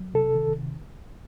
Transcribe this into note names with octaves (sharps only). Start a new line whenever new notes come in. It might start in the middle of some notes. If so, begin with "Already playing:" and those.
Already playing: F#3
C3 A4
D#3
C3